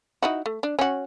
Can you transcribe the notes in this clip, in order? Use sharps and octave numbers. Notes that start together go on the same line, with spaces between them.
D#4 E4 F#4
A3
D4
C#4 F#4